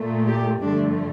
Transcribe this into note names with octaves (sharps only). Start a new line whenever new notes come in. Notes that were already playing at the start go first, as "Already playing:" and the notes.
Already playing: A#2 A3
G4
G2 D3 F3 A3 D4